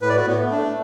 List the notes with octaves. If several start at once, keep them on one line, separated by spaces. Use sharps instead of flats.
A2 B4
D5
A2 F#4 B4
B3
A3
D4
A3